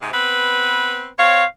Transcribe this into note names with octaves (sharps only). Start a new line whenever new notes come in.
G#2 C3
B3 C4 B4
C4 C#5 F5